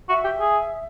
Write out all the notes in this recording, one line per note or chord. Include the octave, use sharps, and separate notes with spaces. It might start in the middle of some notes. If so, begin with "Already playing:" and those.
F#4 E5
G4
G#4